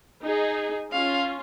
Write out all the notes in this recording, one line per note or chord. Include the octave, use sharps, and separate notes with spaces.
D#4 G#4
C#4 F4 F5